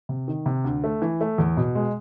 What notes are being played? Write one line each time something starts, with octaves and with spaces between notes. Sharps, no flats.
C3
D#3
C3
D2
A3
E3
A3
E2
B2
G#3